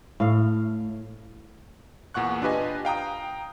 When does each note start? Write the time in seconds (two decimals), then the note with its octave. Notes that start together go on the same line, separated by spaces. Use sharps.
0.20 A2 F5
2.14 E2 A#2 F#5 C#6 F#6
2.42 D4 F4 G4 B4 D#5 G#5
2.85 F5 G5 A#5 D#6